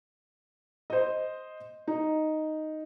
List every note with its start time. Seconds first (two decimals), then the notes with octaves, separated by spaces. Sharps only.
0.90 C5 D#5
1.87 D#4